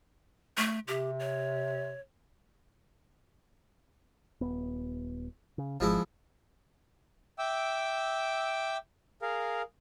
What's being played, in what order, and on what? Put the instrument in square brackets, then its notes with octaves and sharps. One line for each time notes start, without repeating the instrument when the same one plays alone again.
[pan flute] A3
[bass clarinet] C3 [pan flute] G4
[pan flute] C#5
[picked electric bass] D#1 B3
C#3
[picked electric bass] G#1 [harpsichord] F3 G#3 E4
[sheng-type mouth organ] E5 G5 D6 E6
G#4 A#4 F5